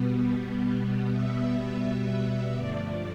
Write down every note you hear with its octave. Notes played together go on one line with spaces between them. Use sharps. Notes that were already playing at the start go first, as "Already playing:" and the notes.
Already playing: B2 G3 B3
E5
E5
G2 D3 F3 A3 D5